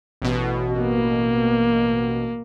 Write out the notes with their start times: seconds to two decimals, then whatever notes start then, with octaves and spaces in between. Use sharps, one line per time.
0.22 A1 B2
0.80 A#3